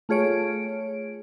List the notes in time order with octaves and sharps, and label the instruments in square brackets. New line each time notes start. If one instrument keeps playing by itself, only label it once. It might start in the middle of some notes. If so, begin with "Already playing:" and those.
[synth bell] A3 F4 G#4 C#5 D7